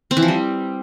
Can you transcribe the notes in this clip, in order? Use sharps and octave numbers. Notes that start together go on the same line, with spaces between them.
C4
E3
F3
G3